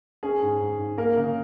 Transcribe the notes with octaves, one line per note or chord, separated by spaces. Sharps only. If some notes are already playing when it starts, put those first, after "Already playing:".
C#4 G#4
G#2
G#2
G#2
A#3 A#4
C#3